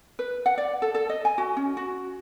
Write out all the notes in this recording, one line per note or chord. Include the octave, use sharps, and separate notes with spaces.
B4
F#5
D5
A4
A4
D#5
G#5
F#4
C#4
F#4